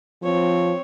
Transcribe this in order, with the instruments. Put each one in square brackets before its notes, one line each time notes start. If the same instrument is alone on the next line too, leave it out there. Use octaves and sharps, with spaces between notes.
[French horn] F3 [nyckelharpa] C4 C#5